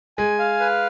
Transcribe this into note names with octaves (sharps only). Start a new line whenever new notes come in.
G#3 G#5
F5
B4